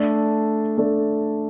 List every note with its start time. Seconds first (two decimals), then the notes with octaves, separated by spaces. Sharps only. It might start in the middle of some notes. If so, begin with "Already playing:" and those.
Already playing: A3 D4 A4
0.77 A3 D4 A4